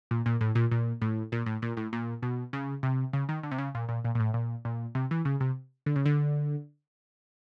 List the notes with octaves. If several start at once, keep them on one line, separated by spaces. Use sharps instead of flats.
A#2
A#2
A2
A#2
A#2
A2
A#2
A2
A#2
A2
A#2
B2
C#3
C3
C#3
D#3
D3
C3
C#3
A#2
A#2
A#2
A#2
A2
A#2
A#2
C3
E3
C#3
C3
D3
C#3
D3